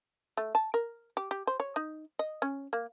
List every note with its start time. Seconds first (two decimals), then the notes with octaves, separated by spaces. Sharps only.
0.37 A3
0.55 A5
0.74 A#4
1.17 G4
1.31 G4
1.47 C5
1.60 C#5
1.76 D#4
2.19 D#5
2.42 C#4
2.73 A#3